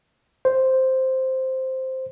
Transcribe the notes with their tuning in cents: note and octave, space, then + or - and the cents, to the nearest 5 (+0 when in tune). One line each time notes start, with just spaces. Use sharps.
C5 +0